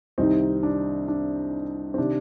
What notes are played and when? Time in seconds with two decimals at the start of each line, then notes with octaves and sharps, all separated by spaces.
0.18 C2 C3 D#3 C4 D#4
0.63 D4
1.08 D4
1.94 C4
1.98 C3 D#3 D4